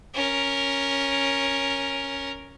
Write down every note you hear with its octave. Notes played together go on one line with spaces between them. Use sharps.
C#4 A#4